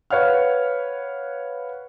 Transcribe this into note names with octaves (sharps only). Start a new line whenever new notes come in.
B4 C#5 F5 F#5 F6